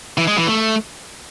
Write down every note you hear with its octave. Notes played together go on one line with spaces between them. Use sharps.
E3
G#3
E3
A3